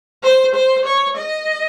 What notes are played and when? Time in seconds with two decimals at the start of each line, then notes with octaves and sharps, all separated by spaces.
0.23 C5
0.55 C5
0.86 C#5
1.17 D#5